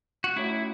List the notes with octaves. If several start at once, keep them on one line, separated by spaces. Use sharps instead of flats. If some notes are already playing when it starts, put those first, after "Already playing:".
F#4
A3 C#4 E4 F#4 C#5